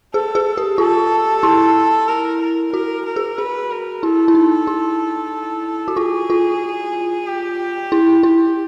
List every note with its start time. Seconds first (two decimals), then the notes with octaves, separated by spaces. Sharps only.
0.14 G#4 A4
0.35 G#4
0.57 G4
0.78 F4 A4
1.43 E4
2.08 A#4
2.41 A#4
2.73 F#4 A#4
3.06 A#4
3.16 G#4
3.38 G#4 B4
3.71 A#4
4.03 E4 A4
4.28 E4
4.35 D#4
4.67 E4
5.88 F#4
5.97 F4 G#4
6.30 F4
7.27 G4
7.92 E4
8.23 E4